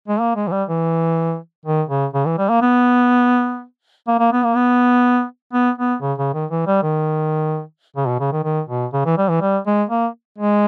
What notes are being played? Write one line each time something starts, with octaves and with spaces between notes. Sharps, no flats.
G#3
A#3
G#3
E3
G3
E3
D#3
C#3
C#3
E3
G3
A#3
B3
A#3
A#3
B3
A#3
B3
B3
B3
C#3
C#3
D#3
E3
G3
D#3
C#3
B2
C#3
D#3
D#3
B2
C#3
E3
G3
E3
G3
G#3
A#3
G#3